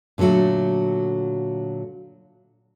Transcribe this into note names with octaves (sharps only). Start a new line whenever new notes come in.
A#2 D3 F3 F#3 A3